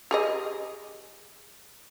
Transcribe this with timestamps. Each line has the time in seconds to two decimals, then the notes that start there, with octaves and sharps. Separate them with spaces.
0.11 G4 G#4 D#5